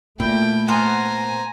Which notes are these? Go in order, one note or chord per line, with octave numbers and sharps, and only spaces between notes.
A#2 A3 E4 G5
B3 A#4 C5 G#5 A#5